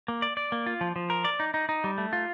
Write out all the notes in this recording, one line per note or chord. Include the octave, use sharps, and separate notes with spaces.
A#3
D5
D5
A#3
F4
F3
F3
A#4
D5
D#4
D#4
D#4
G3
A3
F4